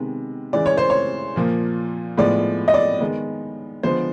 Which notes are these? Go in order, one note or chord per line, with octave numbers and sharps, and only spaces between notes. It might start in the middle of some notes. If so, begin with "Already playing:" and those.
Already playing: C3 D#3 G#3 B3
C#3 E3 G#3 D5
C#5
C5
C#5
A#2 F3 A#3
A2 F3 G#3 B3 D5
D#5
D5
D#3 G#3 B3
D3 F3 G#3 B3 C5